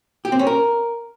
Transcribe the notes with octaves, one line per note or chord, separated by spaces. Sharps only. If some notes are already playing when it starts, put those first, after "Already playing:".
G4
C4
C#4
A#4